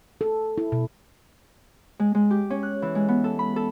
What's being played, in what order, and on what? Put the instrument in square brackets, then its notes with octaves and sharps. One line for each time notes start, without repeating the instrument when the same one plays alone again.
[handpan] A4
E4
B2
[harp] G#3
G#3
G4
C#4
F#6
E3
G#3
B3
A4
B5
A4